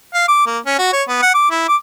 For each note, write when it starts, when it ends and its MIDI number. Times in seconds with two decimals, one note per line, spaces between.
0.14 0.25 77
0.28 0.44 86
0.46 0.58 58
0.66 0.77 61
0.79 0.92 66
0.93 1.03 73
1.09 1.22 59
1.22 1.32 78
1.34 1.50 86
1.51 1.66 64
1.68 1.76 86